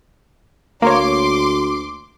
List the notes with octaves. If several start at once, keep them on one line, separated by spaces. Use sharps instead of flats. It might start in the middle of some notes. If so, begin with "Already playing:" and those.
D2 A#3 C#5 C6 D6